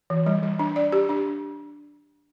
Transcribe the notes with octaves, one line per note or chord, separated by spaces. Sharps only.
E3
G3
G3
D4
D5
G4
D4